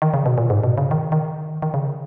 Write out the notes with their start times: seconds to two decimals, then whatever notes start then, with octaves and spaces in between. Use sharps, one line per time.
0.02 D#3
0.14 C#3
0.26 B2
0.38 A#2
0.50 G#2
0.64 B2
0.78 C#3
0.91 D#3
1.12 D#3
1.62 D#3
1.74 C#3